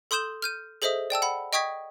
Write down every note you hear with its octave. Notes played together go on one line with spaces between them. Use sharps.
A4 C6 D#6 G6 E7 G7
F6 G6 D#7
G#4 A4 C5 D#5 E5 D#6
D5 G5 A5 E6
F#5 B5
D#5 G5 C#6 D#6 G#6 B6